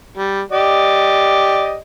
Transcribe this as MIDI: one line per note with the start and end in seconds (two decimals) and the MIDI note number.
0.17 0.41 55
0.52 1.76 67
0.52 1.76 74
0.52 1.76 75